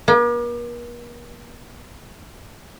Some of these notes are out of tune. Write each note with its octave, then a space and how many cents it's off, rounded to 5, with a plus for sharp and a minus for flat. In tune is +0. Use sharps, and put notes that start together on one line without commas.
A#3 +45